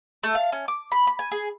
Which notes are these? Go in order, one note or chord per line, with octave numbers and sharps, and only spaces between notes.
A3
F5
C#4
D6
B5
B5
G#5
G#4